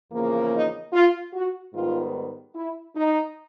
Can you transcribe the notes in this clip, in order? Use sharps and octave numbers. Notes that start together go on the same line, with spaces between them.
E2 C#3 F3 A#3
D#4
F4
F#4
G#2 D#3 G3 B3 F4
E4
D#4